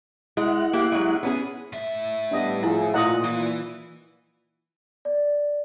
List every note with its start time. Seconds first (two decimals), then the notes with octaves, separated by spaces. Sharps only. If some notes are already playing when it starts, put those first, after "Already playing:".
0.37 G#3 E4 F#5
0.73 A#3 G4
0.92 F#3 G#3
1.23 B3 C#4 G#4
1.73 A2 E5
2.31 G3 B3 D4 D#5
2.63 F3 E4 G#4
2.94 A#2 E4 F4 D#5 F#5 D#6
3.24 E3
5.05 D5